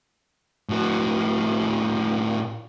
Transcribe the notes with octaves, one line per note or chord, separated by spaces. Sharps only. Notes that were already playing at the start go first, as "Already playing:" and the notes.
A2 F#4